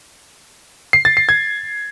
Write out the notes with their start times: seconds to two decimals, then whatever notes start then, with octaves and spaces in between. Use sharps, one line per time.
0.93 C7
1.05 A6
1.17 C7
1.29 G#6